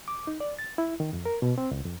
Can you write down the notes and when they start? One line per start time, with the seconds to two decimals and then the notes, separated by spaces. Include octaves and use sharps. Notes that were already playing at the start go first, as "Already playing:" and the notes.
0.08 D6
0.27 D#4
0.40 D5
0.59 A6
0.78 E4
1.00 D#3
1.13 F2
1.25 A#4
1.42 B2
1.58 C4
1.71 C#2
1.85 F2